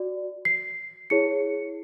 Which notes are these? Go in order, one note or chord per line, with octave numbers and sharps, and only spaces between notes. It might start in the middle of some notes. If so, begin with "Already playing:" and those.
Already playing: F#4 D5
C7
E4 G#4 C#5 C#7